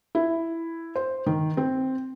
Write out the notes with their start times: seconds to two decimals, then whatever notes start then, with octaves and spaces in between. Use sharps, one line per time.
0.15 E4
0.96 C5
1.26 D#3
1.57 C4